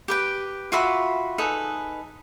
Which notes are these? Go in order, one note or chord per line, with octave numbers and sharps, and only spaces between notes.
G4 B4 G5
F4 F#4 E5 B5
D#4 G#4 A4 B4